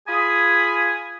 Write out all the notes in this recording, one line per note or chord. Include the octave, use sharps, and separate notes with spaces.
F4 G#4 G#5 B5 D#6